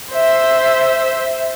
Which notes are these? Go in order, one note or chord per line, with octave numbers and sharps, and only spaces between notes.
C5 E5